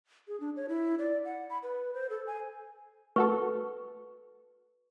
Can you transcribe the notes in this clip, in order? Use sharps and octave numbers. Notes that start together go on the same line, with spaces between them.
G#4
D4
C#5
E4
D5
F#5
B5
B4
C5
A4
G#5
A3 F#4 A4 B4 C#6